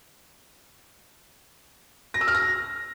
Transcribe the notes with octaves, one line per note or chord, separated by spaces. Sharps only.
A#6
E6
F6
A#6